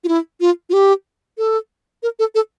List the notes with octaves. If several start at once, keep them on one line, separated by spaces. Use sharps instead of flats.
F4
E4
F4
F4
G4
A4
A#4
A4
A4